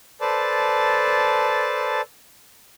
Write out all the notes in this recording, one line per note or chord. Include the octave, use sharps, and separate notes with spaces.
A4 B4 C5 D5 A5